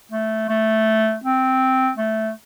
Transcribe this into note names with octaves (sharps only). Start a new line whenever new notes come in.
A3
A3
C4
A3